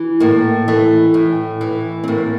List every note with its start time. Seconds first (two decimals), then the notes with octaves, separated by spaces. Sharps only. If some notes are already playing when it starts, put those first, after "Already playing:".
Already playing: E3
0.20 A2 A#3
0.68 E3 A3
1.14 A2
1.61 E3
2.04 C4
2.08 A2 A#3